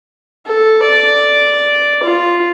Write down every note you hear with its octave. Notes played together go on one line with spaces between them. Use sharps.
A4
D5
F4